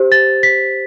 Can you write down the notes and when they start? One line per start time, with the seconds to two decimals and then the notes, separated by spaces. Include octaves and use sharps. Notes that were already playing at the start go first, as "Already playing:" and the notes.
Already playing: G4 C5
0.12 A6
0.43 B6